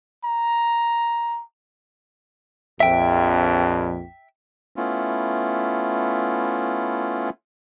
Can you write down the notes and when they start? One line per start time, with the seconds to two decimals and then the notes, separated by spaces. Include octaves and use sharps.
0.24 A#5
2.80 A#1 F2 E5 G5
4.76 A3 B3 C#4 E4 F4